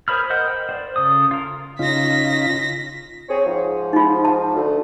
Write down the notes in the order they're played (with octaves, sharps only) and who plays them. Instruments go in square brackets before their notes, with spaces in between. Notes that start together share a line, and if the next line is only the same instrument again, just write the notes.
[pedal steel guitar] G#4 A#4 C5 B5 F6
A#4 C5 D#5 F#5 F6
G5
C5 D5
C#3 A4 D#6
F4 A#4
[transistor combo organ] C#3 D#4 F4 [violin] A#6 B6
[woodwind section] C4 G#4 C#5
G#2 F3
[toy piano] D#4 F4
A5
[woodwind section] D2